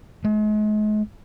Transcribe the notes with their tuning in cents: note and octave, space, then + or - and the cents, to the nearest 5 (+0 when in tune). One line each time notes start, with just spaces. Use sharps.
G#3 +40